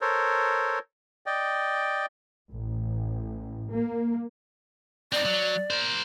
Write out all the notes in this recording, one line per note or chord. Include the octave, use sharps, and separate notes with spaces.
A4 A#4 C5 C#5
D5 D#5 G5
A1
A#3
C4 D#4 D5
F#3
A#4 C5